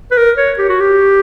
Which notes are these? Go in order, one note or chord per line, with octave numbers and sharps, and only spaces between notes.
B4
A#4
C#5
G4
F#4
G4